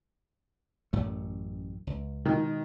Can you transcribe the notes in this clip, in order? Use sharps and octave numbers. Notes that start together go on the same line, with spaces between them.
A1 F#2 A3
C#2
B2 D#3 G#3